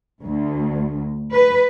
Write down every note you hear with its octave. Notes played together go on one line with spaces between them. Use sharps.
D2
B4